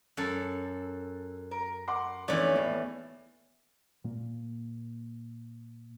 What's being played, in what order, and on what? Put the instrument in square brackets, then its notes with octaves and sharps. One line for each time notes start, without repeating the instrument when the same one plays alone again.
[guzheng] F#2 A4
[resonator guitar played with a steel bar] A#4
[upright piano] F#5 C6 D6
[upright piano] F2 D#4 [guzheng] E3 A3 [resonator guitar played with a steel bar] C#4 C#5 D5
[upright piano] E2 C#5 [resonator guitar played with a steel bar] A2
[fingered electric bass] A#2 A#3